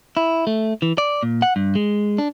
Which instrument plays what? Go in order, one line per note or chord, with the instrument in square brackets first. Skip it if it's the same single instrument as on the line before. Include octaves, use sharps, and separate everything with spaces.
[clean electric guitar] E4
A3
E3
D5
A#2
F#5
G2
G#3
D4